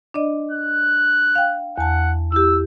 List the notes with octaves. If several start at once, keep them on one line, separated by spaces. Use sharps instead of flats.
D4 D5 D#5
F#6
F5 G5
E2 F#5 A5
E4 G4 E6